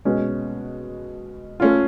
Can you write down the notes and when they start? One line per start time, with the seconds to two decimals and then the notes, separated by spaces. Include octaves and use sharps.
0.05 B2 G#3 C#4
1.60 A3 C#4 F4